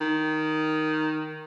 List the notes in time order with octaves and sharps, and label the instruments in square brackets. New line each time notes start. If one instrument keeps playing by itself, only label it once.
[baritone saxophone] D#3